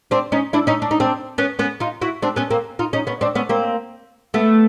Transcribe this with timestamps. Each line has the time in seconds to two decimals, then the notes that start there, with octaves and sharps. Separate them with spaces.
0.11 C4 D4
0.32 C#4 D#4
0.53 D4 E4
0.67 C#4 D#4
0.82 D4
0.91 D#4
1.00 C4 D4
1.38 B3 C#4
1.59 B3 C#4
1.80 D#4 F4
2.02 E4 F#4
2.22 C4 D4
2.36 B3 C#4
2.50 A#3 C4
2.79 D#4 F4
2.93 C#4 D#4
3.07 B3 C#4
3.21 C4 D4
3.35 B3 C#4
3.49 A#3 C4
4.34 A3 B3